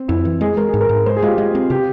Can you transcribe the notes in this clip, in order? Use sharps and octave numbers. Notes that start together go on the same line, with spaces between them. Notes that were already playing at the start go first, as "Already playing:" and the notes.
Already playing: C4
F2 E4
E3
G#3 G#4
G#3 A#4
G#4
G#2
A#4
G#2
G#3 C5
G#4
G#3 F4 G4
G#3 F4
C4
C3 G4